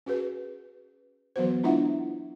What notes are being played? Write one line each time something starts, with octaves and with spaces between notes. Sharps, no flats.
C#4 F#4 G#4 B4
E3 F#3 B3 F#4 C5
G#3 D4 E4 F4 E5 F#5